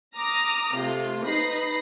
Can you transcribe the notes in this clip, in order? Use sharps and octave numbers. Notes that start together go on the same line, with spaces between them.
A#5 D6 D#6 F6 A#6
C3 A3 F4
D#4 B4 B5 A#6 C7